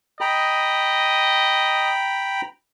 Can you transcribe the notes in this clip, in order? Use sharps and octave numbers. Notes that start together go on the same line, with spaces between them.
D#5 G5 A#5 B5